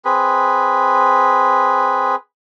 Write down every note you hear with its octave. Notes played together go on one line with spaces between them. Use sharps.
C4 G#4 B4